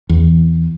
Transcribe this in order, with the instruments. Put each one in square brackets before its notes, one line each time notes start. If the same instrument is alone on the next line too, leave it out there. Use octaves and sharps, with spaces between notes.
[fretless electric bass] E2